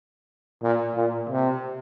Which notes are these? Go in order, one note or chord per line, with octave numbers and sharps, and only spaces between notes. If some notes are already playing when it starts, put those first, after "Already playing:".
A#2
A#2
C3